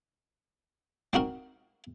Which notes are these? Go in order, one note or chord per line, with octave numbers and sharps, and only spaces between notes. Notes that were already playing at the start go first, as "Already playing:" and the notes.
C4 D#4 F#4 A#4